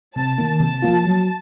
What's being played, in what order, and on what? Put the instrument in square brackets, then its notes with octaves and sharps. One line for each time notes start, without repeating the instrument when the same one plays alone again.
[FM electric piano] C3 [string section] A5
[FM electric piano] D#3 A#3
[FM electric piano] C3 [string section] A5
[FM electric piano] F3 A#3 F4
F#3